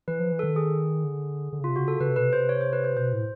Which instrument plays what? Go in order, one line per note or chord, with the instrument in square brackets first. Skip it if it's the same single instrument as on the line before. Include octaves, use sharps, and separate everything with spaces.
[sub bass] E3 [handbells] B4
[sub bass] F3
E3
[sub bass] D#3 [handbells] A4
[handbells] G#4
[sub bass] D3
D3
C#3
[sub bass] C3 [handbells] F4
[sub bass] C#3 [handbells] F#4
[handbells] A4
[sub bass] C#3 [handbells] B4
[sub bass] C3
[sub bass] B2 [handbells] B4
[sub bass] C3
[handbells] C5
C#5
C5
B4
C5
[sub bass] B2 [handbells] C5
[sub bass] A2